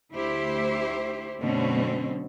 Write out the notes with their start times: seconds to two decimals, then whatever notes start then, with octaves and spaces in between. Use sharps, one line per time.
0.13 D2 E4 G4 C5
1.41 F#2 B2 D3 A3 C4 C#4